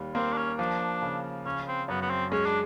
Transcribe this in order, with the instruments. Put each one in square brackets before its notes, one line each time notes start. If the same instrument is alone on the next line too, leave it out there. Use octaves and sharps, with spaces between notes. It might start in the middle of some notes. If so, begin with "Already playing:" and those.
Already playing: [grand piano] D#2 G3
[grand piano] A#3 [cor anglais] C4
[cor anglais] D4
C#4
[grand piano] F3 [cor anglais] D4
[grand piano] C#3
[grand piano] C#3 [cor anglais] C#4
[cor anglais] C4
[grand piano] F#2 [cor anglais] B3
[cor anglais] B3
C4
[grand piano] G#3 [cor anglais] C#4
[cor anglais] D4